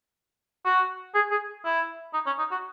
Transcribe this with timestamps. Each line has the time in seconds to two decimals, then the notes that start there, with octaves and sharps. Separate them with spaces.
0.66 F#4
1.15 G#4
1.31 G#4
1.65 E4
2.14 D#4
2.26 C#4
2.39 D#4
2.51 F#4